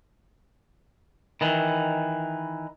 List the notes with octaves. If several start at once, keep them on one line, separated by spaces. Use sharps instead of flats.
D#3 E3